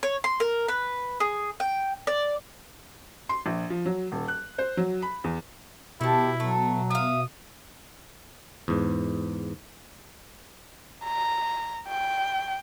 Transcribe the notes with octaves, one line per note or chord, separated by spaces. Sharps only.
C#5
C6
A#4
B4
G#4
G5
D5
C6
A#1
F3
F#3
D#1
F#6
C5
F#3
B5
E2
B2 D#3 E4 G4 A5
F#3 A3
E5 F5 D#6
E2 G#2
A#5
G5